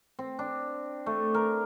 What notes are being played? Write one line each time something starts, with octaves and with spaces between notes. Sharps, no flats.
C4
D4
A3
A#4